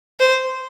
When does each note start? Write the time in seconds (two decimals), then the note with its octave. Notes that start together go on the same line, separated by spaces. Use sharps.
0.20 C5